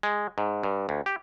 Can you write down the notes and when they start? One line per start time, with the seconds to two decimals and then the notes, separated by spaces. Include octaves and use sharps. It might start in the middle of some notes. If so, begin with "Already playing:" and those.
0.03 G#3
0.38 G#2
0.63 G2
0.89 D2
1.06 G4